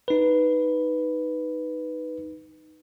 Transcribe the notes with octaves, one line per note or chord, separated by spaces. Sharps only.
D#4 B4